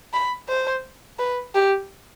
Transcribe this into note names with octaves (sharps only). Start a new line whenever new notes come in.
B5
C5
B4
G4